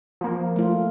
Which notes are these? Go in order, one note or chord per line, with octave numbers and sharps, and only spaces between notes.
F3 A#3
A3 F4